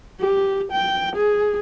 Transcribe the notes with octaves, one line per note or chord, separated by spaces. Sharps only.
G4
G5
G#4